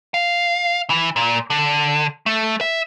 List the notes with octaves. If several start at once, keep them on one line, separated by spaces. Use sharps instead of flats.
F5
E3
A#2
D3
A3
E5